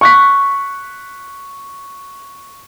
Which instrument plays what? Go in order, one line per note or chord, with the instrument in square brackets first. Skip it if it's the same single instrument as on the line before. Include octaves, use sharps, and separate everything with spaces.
[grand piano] C#6 F#6 B6